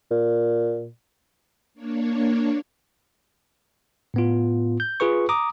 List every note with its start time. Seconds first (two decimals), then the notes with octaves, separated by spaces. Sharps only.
0.11 A#2
1.74 A#3 D4 C#5
4.14 A2 B3 F4
4.80 G6
5.00 F4 G#4 B4 C#6
5.29 A#5 D6 D#6